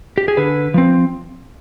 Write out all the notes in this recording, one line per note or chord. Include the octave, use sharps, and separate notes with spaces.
G4
G#4
D3 B4
F3 C4